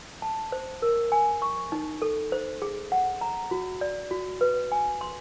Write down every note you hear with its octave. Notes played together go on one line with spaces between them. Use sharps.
A5
C5
A#4
G#5
C#6
D#4
A4
C5
G#4
F#5
A#5
F#4
D5
F#4
B4
G#5
C6